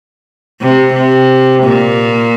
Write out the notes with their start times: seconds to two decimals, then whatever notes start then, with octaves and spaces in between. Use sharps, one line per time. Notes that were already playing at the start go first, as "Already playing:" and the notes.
0.61 C3
0.94 C3
1.63 A#2